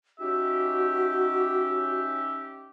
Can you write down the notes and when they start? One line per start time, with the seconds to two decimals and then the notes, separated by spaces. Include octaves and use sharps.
0.20 C#4 D#4 F#4 G4 E5